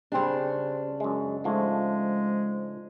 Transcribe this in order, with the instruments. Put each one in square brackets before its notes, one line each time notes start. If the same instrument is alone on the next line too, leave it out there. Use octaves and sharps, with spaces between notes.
[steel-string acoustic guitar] C#3 D4 [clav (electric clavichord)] G3 C4
[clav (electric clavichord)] F#2 G#3
[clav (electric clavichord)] G#2 F3 A3 [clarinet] G#3